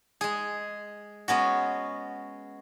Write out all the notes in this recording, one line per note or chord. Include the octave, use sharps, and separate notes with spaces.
G#3 G#4
G#3 B3 C#4 F#4